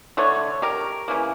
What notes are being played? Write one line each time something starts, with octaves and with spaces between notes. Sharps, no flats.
D3 A3 A4 C#5
G4 A#4
C#3 E3 A#3